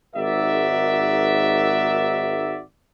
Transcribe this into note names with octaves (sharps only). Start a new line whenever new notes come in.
G#1 G#2 F#4 A#4 D5 E5